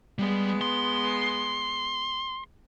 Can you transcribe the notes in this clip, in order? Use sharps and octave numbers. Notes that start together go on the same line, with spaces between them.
G3 G#3 B3
C6